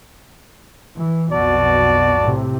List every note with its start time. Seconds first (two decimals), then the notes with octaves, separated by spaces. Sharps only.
0.97 E3
1.32 B1 F2 B2 F#4 D5 A5
2.20 A2 C3